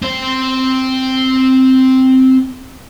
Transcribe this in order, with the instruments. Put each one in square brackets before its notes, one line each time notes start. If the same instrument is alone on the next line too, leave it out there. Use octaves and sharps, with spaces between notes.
[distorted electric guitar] C4 C5